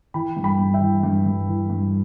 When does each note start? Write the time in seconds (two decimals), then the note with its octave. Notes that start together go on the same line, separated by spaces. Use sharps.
0.14 E3 G5 B5
0.37 G2
0.44 G5 B5
0.59 G2
0.74 E5 G5
0.81 E3
1.03 G2
1.26 G2
1.48 E3
1.70 G2